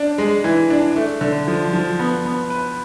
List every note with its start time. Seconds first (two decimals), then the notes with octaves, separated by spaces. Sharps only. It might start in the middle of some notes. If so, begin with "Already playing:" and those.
Already playing: D4
0.18 G#3
0.44 E3
0.70 D4
0.96 A3
1.21 D3
1.48 F3
1.73 F3
1.99 B3
2.25 B3
2.50 B4